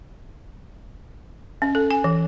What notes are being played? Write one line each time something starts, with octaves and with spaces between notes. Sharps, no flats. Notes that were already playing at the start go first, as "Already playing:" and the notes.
C#4
A4
G#5
E3